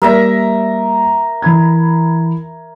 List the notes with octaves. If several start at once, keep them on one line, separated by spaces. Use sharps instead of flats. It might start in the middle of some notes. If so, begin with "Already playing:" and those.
G3 A#3 A#4 D5 E5 A#5
E3 B5 G#6